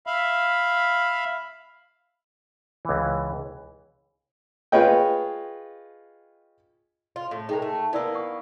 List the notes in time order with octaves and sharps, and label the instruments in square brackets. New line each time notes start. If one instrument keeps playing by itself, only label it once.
[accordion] E5 F5 B5
[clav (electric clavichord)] C#2 E3
[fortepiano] F4 G#4 B4 C#5 D#5 G5
[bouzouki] F4
A2
[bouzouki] G#3 A#4 [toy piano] D#4 G5
[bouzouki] A3
[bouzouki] A#3 B3 [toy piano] E4 D5 E6
[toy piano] F#5 C#6 D#6